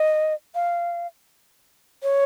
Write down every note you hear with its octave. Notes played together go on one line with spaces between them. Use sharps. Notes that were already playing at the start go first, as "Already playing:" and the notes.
Already playing: D#5
F5
C#5